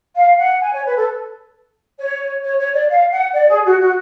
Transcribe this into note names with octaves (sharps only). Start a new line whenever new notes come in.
F5
F#5
G#5
C#5
B4
A4
C#5
C#5
C#5
D5
F5
F#5
D5
G#4
F#4
F#4